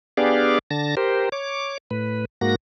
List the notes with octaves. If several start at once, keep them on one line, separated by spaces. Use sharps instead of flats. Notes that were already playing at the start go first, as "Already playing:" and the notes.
B3 D4 G4 G#4 D5 F5
D3 A5 A#6
G4 A#4 C5
C#5 D6
A2 B4
G#2 A#3 F#4 A#6